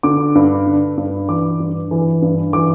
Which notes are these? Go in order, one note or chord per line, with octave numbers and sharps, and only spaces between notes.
D3 D6
G2
D3
G2
E3 D6
G2
E3
G2
E3 D6